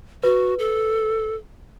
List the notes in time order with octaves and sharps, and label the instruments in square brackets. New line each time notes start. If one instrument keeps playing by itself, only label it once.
[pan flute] F#4 [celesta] B4
[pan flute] A4